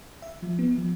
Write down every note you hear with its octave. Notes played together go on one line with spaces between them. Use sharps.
E5
F3
B3
F3